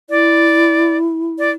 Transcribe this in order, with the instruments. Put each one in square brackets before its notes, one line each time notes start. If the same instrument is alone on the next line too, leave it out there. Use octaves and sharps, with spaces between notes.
[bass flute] E4 [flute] D5
[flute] D5